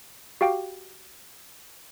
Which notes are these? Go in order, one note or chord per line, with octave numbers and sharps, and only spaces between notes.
F#4 G4 F5 G5